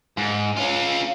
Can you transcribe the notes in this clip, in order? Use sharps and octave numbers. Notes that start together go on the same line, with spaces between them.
G#2
C#4 F4